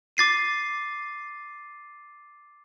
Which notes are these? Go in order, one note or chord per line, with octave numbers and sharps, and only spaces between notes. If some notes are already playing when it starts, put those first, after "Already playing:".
D6 A6 C7 D#7